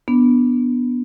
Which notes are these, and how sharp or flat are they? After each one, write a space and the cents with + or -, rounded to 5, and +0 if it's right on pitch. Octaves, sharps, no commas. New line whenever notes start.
B3 -5 D4 +0